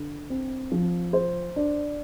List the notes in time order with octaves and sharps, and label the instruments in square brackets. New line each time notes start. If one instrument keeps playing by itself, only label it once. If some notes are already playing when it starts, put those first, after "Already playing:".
Already playing: [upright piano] D3
C4
F3
C5
D4